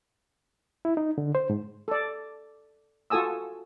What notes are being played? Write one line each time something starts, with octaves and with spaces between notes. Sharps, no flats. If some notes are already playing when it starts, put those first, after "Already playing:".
E4
D#4
D3
C5
G#2
A4 D5
F4 F#4 A4 G#5 D#6 E6